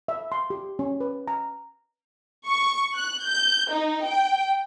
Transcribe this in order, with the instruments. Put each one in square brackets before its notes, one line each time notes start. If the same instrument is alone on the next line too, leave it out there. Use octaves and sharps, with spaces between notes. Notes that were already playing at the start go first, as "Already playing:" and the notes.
[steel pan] E5
C6
G4
C#4
B4
A#5
[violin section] C#6
F#6
G6
D#4
G5